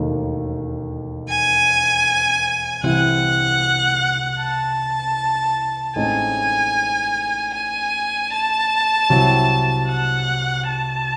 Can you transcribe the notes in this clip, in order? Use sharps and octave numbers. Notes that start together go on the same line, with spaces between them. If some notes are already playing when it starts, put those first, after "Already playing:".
Already playing: E1 D#2 D#3 A3
G#5
C2 C3 E3 C4 E4 F#5
A5
A1 A2 G#3 C4 D#4 G#5
G#5
A5
C2 C3 F#3 C4 E4
F#5
A5